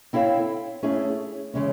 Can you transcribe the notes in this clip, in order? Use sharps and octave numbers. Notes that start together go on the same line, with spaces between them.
C4 E4 A4 C#5 F5
A3 C#4 E4 G#4
C#3 E3 G#3 C#4